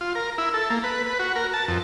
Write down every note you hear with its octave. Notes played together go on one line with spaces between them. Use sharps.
F4
A#4
E4
A4
A#3
B4
B4
F#4
A#4
A5
F2